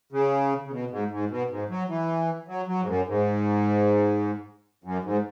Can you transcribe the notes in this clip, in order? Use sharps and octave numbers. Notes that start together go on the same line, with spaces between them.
C#3
C#3
B2
G#2
G#2
B2
G#2
F#3
E3
F#3
F#3
G#2
F#2
G#2
F#2
G#2